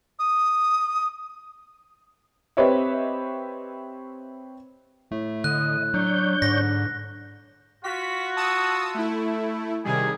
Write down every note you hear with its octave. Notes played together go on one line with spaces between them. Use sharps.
D#6
C4 G4 B4 C#5 D#5 E5
A2 A3
D3 D#5 F#6
F#3 D4 C#5 G6
G#2 D3 A#6
F4 F#4 B6
A5 D#6 E6
A3 E4
C3 D#3 G3 G#4